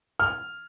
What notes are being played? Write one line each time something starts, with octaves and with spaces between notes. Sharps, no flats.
F6